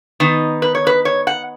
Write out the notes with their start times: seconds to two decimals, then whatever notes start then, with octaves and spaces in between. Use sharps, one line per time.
0.20 D#3 B3 D#4 D#5
0.62 B4
0.75 C#5
0.87 B4
1.05 C#5
1.27 F#5